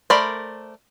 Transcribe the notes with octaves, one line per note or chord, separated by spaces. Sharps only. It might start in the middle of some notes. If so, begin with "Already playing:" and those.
A3 A#4 C5 D5 B5